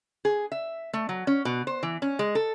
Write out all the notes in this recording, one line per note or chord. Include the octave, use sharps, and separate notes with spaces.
G#4
E5
A3
F#3
C#4
B2
C5
E3
C#4
G#3
A4